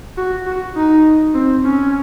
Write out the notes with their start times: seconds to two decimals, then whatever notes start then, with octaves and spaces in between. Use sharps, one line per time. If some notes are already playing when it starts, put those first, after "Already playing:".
0.18 F#4
0.46 F#4
0.76 D#4
1.34 C4
1.64 C#4